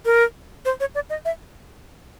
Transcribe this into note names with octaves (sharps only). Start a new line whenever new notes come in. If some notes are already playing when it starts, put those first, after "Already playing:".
A#4
C5
C#5
D5
D#5
E5